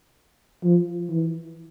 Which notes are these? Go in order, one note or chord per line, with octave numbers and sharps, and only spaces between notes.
F3
E3